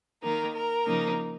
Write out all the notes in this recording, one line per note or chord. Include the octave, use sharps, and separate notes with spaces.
D#3 A#3 D#4 A#4
A#4
C#3 F3 A#3 D#4